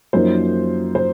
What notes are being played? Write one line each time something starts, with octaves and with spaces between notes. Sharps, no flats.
F#2 F3 A#3 D#4 C5
C5